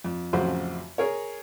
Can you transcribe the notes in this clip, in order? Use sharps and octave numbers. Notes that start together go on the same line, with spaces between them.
F2
A1 F2 C#3 F#3 F#4 C5
G#4 A#4 C#5